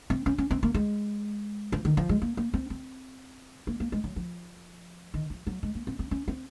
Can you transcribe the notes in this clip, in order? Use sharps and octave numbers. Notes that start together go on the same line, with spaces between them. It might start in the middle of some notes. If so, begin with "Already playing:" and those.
C4
C#4
C#4
C4
A#3
G#3
F3
D#3
F3
G#3
A#3
A#3
C4
C4
A#3
A#3
G#3
F#3
F3
D#3
F3
F#3
G#3
A#3
C4
C4
C#4
C4